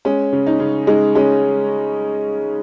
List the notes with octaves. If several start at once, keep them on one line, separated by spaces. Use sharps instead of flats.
G#3 C#4
C#3
D#4
C#3
G#3 D#4
G#3 C#4